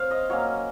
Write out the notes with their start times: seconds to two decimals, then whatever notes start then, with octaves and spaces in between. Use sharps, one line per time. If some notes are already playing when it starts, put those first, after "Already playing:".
Already playing: C4 C#5 F5
0.11 D#5
0.29 F#3 A#3 C#4 C#5